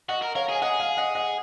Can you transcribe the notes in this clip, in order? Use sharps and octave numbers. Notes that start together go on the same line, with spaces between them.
F#4 D#5 F#5
A#4
A#4 C#5 F5
G#4
G#5
G#4 D#5 F#5
F5 G#5
D#5 F#5
D#5 F#5